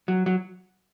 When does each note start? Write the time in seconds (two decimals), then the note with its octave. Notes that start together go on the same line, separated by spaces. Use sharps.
0.08 F#3
0.26 F#3